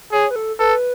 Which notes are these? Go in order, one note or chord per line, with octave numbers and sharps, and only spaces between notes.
G#4 C#5
B4
A4
A4 B4